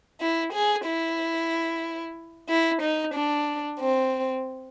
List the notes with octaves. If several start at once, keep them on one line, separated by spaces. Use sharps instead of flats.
E4
G#4
E4
E4
D#4
D4
C4